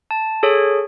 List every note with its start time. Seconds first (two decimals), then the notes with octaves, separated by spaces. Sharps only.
0.11 A5
0.43 G#4 A4 C#5